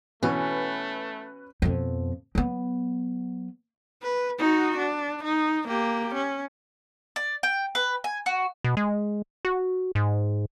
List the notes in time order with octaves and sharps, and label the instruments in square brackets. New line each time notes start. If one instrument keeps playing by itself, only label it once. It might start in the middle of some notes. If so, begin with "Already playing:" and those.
[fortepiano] B2 E3 [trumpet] A3 [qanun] C#4 [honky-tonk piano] B4
[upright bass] F2 B2
F#3 B3
[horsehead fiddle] B4
D#4 F#4
D4
D#4
A#3 G4
C#4
[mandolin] D5
G5
B4
G#5
F#4
[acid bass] B2
G#3
F#4
G#2